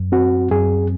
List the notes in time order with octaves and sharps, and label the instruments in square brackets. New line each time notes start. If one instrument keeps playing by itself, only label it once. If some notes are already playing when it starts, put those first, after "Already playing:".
Already playing: [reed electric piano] F#2
C4 F#4
F#2 G#4